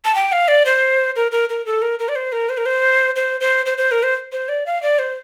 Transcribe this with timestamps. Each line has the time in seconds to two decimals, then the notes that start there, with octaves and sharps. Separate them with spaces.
0.05 A5
0.15 G5
0.32 F5
0.48 D5
0.66 C5
1.16 A#4
1.32 A#4
1.49 A#4
1.66 A4
1.82 A#4
1.99 A#4
2.09 D5
2.16 C5
2.32 A#4
2.49 C5
2.58 A#4
2.66 C5
3.16 C5
3.41 C5
3.66 C5
3.78 C5
3.91 A#4
4.03 C5
4.32 C5
4.49 D5
4.66 F5
4.82 D5
4.99 C5